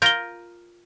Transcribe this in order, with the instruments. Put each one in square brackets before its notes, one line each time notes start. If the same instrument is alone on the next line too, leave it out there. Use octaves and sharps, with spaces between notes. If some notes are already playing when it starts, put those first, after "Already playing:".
[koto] F4 A#4 [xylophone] G6 A#6 G7